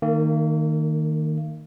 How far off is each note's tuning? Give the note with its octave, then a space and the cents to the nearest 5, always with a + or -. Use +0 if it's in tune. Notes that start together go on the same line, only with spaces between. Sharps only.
D#3 +0 A#3 -35